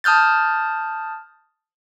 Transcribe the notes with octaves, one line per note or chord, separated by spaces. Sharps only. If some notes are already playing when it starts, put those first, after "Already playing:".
A5 D#6 F6 G6 A6